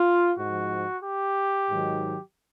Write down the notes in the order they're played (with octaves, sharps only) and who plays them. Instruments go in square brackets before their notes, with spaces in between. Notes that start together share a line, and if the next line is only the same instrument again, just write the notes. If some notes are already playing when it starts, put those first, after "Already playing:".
Already playing: [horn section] F4
G#2 F3 F#4
G4
G#2 D#3 F#3